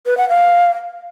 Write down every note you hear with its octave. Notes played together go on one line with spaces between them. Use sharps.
B4
F#5
F5